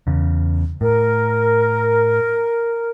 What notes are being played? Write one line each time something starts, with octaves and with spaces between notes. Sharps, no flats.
E2 C#3
A2 A#4